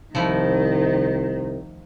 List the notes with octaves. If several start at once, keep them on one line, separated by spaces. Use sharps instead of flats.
C2 D#3 F3 A3 E4